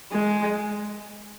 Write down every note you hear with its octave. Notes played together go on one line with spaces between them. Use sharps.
G#3